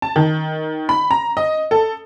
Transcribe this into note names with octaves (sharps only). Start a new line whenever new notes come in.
A5
D#3
B5
A#5
D#5
A4